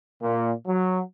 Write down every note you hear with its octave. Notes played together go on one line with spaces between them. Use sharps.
A#2
F#3